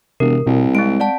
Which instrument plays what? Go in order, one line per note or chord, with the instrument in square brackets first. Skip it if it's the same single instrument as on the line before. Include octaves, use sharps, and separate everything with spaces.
[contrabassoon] E1 [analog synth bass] C3 [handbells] A#4
[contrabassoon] C2 [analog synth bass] B2
[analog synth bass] G#3 [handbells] C4 D7
[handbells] D5 F#5 A5